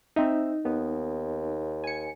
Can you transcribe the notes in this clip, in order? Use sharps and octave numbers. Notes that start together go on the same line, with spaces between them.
C4 D#4 E5
D#2 B3
G#5 C#7